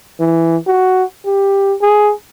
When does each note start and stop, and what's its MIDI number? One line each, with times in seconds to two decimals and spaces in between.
0.20 0.57 52
0.67 1.04 66
1.26 1.75 67
1.81 2.12 68